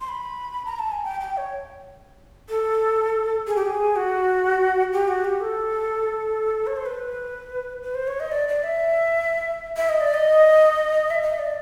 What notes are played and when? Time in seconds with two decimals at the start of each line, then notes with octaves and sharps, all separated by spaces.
0.01 C6
0.08 B5
0.65 A#5
0.79 A5
0.92 G#5
1.04 G5
1.21 G5
1.37 C#5
2.50 A4
3.47 G#4
3.56 G4
3.66 G#4
3.96 F#4
4.92 G4
5.08 F#4
5.24 G4
5.40 A4
6.67 C#5
6.76 C5
6.86 B4
7.83 B4
7.95 C5
8.08 C#5
8.20 D#5
8.32 D5
8.48 D5
8.63 E5
9.77 E5
9.89 D#5
10.01 D5
10.14 D#5
11.10 E5
11.23 D#5
11.38 D5